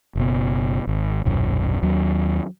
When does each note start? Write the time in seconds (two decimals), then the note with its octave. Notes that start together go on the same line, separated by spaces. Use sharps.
0.15 F#1 B2
0.87 G#1
1.25 D#1 B1 F#2
1.82 D#2 F#3